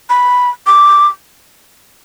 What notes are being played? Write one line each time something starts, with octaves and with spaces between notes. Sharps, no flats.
B5
D6